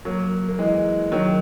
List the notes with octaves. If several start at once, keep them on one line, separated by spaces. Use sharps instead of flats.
F#3 A#3
A#3
E3 G#3
D#3 F#3